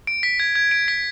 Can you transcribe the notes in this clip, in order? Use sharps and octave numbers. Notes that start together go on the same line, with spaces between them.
D7
B6
G#6
G#6
D7
B6